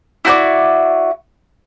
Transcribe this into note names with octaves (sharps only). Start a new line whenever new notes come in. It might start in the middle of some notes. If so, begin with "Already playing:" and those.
E4 F#4 C5 D5